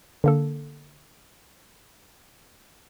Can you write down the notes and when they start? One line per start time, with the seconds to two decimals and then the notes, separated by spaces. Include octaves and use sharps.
0.24 D3 A#3 A4